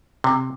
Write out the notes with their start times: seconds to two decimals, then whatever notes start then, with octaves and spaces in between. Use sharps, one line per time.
0.24 C3